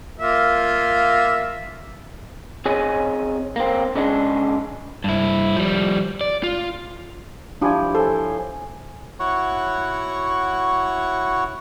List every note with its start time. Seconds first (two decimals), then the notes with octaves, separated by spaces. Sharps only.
0.20 A#3 F4 E5
2.65 C4 G#4 C#5 D#5 G#5
3.56 A#3 C4
3.95 C#3 G#3 D4
5.04 G2 E4
5.57 F3 G3
6.21 D5
6.43 F4
7.61 F3 D4 E4 G4 G#5
7.95 A4 C5 C#5 G#5
9.20 E4 F#4 C#5 F#5 C#6